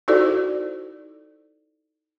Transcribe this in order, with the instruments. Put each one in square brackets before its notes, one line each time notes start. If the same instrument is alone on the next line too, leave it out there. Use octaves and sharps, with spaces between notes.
[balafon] D#4 E4 F#4 A4 C5 D5